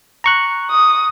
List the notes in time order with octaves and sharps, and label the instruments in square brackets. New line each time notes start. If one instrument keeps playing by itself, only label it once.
[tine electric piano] A#5 C#6 F#6
[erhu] D#6